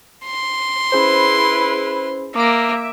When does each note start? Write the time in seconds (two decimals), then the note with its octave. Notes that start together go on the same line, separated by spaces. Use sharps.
0.26 C6
0.92 C#4 E4 G#4 B4 C5
2.35 A#3 E5 D6 A#6 D7